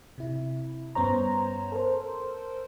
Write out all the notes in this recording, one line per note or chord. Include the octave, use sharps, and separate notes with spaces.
C3 E4
G2 B3 C#4 C5 C#5 A#5
A4 A#4 C5